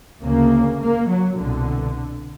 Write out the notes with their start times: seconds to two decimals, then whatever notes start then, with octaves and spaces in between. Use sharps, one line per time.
0.23 D2 C#3 A#3
0.79 A#3
1.08 F#3
1.37 C2 B2 D3